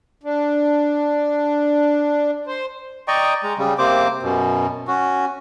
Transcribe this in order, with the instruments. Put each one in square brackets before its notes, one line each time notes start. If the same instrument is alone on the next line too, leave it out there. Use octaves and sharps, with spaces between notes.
[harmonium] D4
C5
[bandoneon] D5 D#5 G5 A#5 C#6
G#3 A#5
C#3 G3
C3 A#3 C4 C5 D6
F#2 B2
C#4 F#4